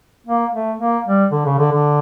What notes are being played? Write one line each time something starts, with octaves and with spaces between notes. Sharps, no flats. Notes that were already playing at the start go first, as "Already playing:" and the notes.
A#3
A3
A#3
G3
D3
C#3
D3
D3